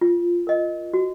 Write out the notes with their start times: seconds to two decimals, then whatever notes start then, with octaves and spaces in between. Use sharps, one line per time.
0.01 F4
0.47 A#4 D#5
0.94 F#4